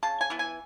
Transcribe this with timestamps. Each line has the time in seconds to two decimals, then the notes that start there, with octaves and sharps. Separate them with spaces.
0.03 C#3 A5
0.21 G#5
0.30 E3 B3
0.39 G#5